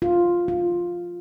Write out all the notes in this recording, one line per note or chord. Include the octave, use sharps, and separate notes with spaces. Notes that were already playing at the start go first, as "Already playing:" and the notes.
F4
F4